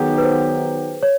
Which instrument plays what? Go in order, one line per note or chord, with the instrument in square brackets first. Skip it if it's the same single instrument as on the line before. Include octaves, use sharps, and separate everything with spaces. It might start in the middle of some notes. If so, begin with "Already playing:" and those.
Already playing: [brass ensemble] D#3 F#3 B3 D#4 G4 [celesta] G#4
[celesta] B4
C5
C#5